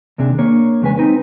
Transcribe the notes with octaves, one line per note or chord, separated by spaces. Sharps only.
D#2 C3 D4 G#4
A#3 D4 C#5
E2 C#3 G#3 B4 G#5
C4 D#4 B4